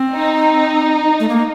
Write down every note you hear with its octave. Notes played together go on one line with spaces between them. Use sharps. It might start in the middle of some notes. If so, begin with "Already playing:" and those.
Already playing: C4
D#4
A3
A#3